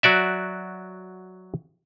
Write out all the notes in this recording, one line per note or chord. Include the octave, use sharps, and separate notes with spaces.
F#3 F#4 D5 E5